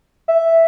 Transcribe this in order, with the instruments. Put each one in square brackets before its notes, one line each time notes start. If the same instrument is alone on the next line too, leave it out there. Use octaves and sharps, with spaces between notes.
[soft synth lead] E5